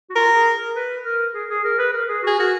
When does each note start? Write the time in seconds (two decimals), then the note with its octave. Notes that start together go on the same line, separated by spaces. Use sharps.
0.10 F#4
0.15 F4 A#4
0.35 G#4
0.55 A#4
0.75 B4
1.04 A#4
1.34 G#4
1.49 G#4
1.64 A#4
1.79 B4
1.93 A#4
2.09 G#4
2.23 F#4 G#4
2.38 F#4 A#4